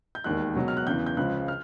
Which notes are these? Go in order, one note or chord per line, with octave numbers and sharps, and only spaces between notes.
G6
E1 D#2 D#3 F#6
C#2 B2 F#3
F6
F#6
E2 C#3 E3 G6
G6
C#2 C#3 F3 F#6
F6